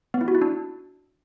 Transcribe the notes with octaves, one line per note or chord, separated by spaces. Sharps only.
B3
E4
F#4
E4
D4